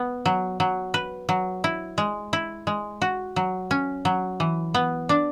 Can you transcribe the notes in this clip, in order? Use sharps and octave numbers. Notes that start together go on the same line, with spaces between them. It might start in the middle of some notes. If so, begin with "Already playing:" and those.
Already playing: B3
F#3
F#3
B4
F#3
E4
G#3
E4
G#3
F#4
F#3
C#4
F#3
E3
B3
D4